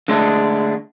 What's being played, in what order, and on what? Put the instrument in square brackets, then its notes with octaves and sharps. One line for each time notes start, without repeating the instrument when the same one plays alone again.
[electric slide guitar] D3 G#3 A3 D4